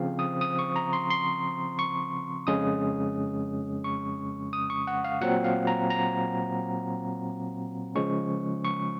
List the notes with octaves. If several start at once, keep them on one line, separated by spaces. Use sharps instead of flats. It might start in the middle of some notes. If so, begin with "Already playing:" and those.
Already playing: C#3 F3 C4 F5
D#6
D#6
C#6
A#5
C6
C6
C#6
F2 C#3 G#3 C#4 D#6
C#6
D#6
C#6
F#5
F5
A#2 F#3 C4 F#5
F5
A#5
A#5
C#3 F3 G#3 C#4 C#6
C#6